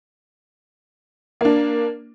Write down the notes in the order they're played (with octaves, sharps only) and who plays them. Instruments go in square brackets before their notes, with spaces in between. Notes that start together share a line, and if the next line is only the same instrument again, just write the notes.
[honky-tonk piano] A#3 D4